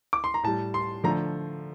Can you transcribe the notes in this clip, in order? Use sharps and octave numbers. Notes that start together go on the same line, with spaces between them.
D6
C6
A#5
A2 G3 A5
C6
D3 F3 A3 A#5